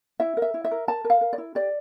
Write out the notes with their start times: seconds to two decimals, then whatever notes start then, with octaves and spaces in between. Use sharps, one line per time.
0.20 E4 E5
0.37 A#4
0.42 E5
0.54 E4
0.64 E5
0.71 A#4
0.88 A#4 A5
1.04 A#4
1.10 F5
1.21 A#4
1.33 D5
1.38 E4
1.55 G4 D5